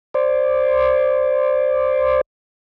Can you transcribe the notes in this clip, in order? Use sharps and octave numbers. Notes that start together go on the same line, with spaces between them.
C5 D5